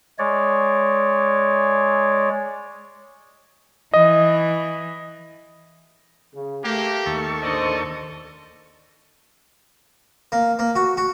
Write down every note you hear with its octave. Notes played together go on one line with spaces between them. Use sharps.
G#3 C#5 D5
E3 D#5
C#3
A3 A#3 G4
D#2 A4 C#6
A1 D4 C5 D5 D#5
A#3
A#3
F#4
F#4